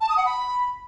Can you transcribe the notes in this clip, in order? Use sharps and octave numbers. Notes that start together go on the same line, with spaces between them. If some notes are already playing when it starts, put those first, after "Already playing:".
A5
D#6
F#5
B5